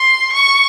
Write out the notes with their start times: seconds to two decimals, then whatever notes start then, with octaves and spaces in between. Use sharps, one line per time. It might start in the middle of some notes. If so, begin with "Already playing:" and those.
Already playing: C6
0.32 C#6